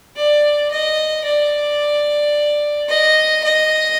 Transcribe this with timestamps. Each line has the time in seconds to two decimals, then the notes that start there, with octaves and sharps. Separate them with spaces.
0.16 D5
0.71 D#5
1.25 D5
2.89 D#5
3.44 D#5